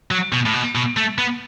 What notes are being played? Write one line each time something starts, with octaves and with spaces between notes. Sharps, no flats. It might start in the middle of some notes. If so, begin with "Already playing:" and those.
F#3
B2
A2
B2
B2
A3
B3